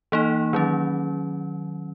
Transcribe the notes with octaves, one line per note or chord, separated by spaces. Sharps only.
E3 A#3 D#4
D#3 F#3 C#4